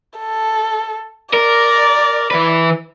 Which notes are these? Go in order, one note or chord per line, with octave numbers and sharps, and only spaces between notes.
A4
A#4 D5
E3 B4